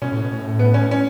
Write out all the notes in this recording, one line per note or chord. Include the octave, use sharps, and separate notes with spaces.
B2 C#4
A2
B2
A2
B3
C#4
C#4